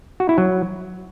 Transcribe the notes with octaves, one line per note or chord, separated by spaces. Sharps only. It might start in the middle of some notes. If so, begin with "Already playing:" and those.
F#4
E4
F#3